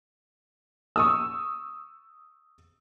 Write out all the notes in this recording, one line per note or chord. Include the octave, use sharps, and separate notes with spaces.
C#6 D#6 E6